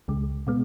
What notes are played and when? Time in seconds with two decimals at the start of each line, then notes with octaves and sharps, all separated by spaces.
0.08 C#2 C#3 G#3
0.47 B2 G#3 B3